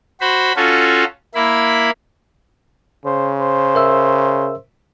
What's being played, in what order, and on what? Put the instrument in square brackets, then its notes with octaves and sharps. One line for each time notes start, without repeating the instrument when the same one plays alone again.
[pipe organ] F#4 C5 B5
C#4 F4 F#4 A4
A#3 E4 B5
[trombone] C#3 [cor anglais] C5
[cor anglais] C5
[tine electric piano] A#4 E5 E6